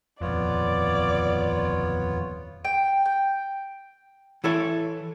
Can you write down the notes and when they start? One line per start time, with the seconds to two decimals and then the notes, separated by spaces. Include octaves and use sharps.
0.21 D#1 G#1 F2 B3 F4 C#5 D5
2.65 G5
3.05 G5
4.44 E3 E4 A4 C#5